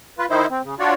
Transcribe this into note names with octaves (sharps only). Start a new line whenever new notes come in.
F4 B4
D#3 D#4 E4 C5
C4
C#3
D4 F4 F#4 C#5 D5